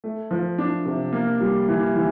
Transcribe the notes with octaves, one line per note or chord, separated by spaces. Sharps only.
A3
F3
D4
C3
A#3
G3
E3
E3